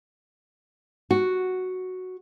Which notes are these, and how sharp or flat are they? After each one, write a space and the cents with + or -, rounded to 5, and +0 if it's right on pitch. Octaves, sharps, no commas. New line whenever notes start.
F#4 +0